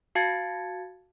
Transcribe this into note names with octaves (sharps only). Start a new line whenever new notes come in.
F#4 F5 A5 G#6 A6 C#7